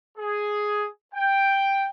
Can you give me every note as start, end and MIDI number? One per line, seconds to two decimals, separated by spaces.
0.18 0.86 68
1.14 1.90 79